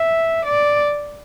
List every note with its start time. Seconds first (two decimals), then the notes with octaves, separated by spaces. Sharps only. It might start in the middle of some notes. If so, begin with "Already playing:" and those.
Already playing: E5
0.45 D5